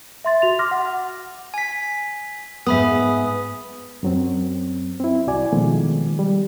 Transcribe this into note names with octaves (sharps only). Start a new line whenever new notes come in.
E5 C6 A6
F#4 F7
C6 D6 F6 A#6
F#5
G#5 B6
G#2 B3 E5 B5 D#6
F#2 F#3 C4
C4 E4
C2 F#4 D5 G#5
B2 D#3 F3 G#3 A3
G3